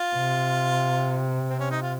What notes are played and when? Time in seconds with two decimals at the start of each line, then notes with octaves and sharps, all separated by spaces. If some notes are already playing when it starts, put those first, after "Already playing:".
Already playing: F4
0.15 C3
1.49 C4
1.60 C#4
1.70 D#4
1.82 F4